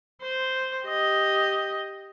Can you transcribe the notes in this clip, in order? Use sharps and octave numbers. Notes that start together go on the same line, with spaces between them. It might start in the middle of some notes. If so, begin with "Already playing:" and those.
C5
G4 D#5